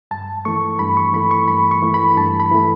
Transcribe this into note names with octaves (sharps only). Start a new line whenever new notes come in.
G2 A5
E3 A3 C#6
G2 B5
C#6
E3 A3 B5
C#6
G2 B5
C#6
E3 A3
B5
G2 A5
B5
E3 A3